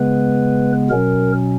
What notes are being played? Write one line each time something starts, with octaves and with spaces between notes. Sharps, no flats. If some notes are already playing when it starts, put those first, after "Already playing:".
Already playing: C#3 G#3 B3 B4
B2 F#3 C#4 A#4